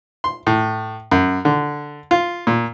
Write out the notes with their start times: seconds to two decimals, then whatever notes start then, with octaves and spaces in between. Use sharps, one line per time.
0.24 C6
0.47 A2
1.11 F#2
1.45 D3
2.11 F4
2.47 A#2